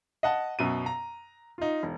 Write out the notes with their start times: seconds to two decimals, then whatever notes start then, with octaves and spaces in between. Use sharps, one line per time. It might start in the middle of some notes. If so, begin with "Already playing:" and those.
0.23 D#5 F#5 A5
0.59 F#2 B2 D#7
0.86 A#5
1.58 D#4 F4
1.83 E1